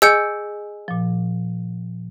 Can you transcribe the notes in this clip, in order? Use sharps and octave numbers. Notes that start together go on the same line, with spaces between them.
G#4 D#5 G#5 E6 G6 C#7
A#2 F3